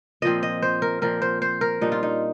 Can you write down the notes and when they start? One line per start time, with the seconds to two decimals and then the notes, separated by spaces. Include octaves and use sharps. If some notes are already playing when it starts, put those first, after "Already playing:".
0.22 A#2 F3 C4 D#5
0.43 D#5
0.62 C5
0.82 A#4
1.02 A#2 F3 C4 A#4
1.22 C5
1.42 C5
1.61 A#4
1.81 A#2 G3 D4 D#4
1.92 F4
2.03 D#4